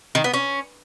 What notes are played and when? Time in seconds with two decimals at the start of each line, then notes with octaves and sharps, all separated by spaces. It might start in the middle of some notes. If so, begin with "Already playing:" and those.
0.15 D#3
0.24 B3
0.34 C#4